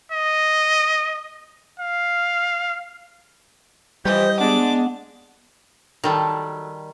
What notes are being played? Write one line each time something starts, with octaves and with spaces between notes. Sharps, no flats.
D#5
F5
E3 F3 G3 G4 C5 D#5
G#3 B3 D4 D6
D#3 F#3 G3 A4 A5